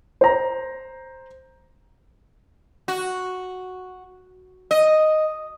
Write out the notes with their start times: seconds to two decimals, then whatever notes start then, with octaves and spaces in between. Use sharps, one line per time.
0.21 C5 A#5
2.88 F#4
4.71 D#5